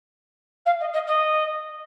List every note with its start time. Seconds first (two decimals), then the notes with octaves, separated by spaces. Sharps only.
0.66 F5
0.80 D#5
0.93 D#5
1.07 D#5